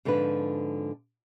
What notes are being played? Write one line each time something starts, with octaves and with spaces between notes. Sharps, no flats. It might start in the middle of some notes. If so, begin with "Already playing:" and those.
G#2 D3 F3 C4 B4